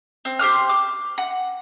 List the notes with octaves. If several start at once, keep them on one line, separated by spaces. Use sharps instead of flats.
C4
G4 C5 D6 F6
D6
F#5